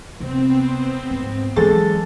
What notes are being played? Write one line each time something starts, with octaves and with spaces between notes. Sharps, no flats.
C3 B3 C4
G#2
E3 F#3 G#3 A4 A6